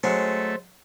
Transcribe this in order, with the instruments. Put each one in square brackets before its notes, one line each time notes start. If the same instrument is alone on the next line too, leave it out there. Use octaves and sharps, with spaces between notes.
[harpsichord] F#3 G#3 C#4 [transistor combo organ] A3 [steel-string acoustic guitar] C5